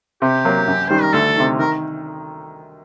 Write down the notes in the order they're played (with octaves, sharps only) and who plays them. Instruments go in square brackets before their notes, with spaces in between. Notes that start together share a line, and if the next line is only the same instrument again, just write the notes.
[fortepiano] C3 [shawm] G4
[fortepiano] F#3 A#3
F#2
[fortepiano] D#3 G3 [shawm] C5
[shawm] A#4
[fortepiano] D2 [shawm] A4
[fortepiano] C3 D#3
[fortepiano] D#3 [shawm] A#4